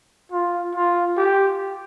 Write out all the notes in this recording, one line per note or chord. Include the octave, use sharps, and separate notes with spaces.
F4
F4
G4